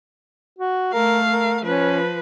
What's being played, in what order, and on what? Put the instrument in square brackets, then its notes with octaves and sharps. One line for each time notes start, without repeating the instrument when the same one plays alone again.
[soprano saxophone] F#4
[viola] A3 F5 [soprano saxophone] A#4
[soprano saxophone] A#4
[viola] F3 B4 [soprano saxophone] C#4